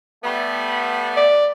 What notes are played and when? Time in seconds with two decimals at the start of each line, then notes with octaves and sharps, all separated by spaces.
0.24 G3 A3 B3
1.17 D5